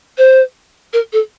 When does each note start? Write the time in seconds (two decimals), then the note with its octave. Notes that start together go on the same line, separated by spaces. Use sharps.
0.17 C5
0.93 A#4
1.12 A4